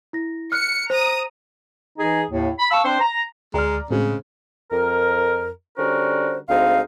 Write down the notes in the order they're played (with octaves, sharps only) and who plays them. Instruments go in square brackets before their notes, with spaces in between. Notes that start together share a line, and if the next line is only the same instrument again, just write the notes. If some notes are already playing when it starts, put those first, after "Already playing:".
[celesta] E4 A#6
[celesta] F6 F#6 [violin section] C#7
[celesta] C5 [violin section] A#5 D#6
[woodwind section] E3 D#4 G#4
D#2 A2
B5
F5 A5 C#6 E6
C4 D4 C5
A#5
[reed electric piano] D2 F6 [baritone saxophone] G#3 [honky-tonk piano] D5 A#5
[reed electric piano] A2 [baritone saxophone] C#3 [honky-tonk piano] G#3 C4
[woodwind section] F2 A#4
D3 G3 C#4 F#4 A#4 C5
D2 G#3 C4 D#4 F5